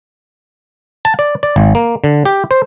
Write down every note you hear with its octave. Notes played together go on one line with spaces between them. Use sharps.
A5
D5
D5
G#1
A#3
D3
G4
C5